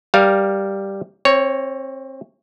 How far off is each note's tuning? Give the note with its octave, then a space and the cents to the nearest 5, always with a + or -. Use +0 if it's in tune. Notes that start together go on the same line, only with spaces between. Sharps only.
G3 +0 A#4 +20 F5 +0
C4 +25 C#5 +0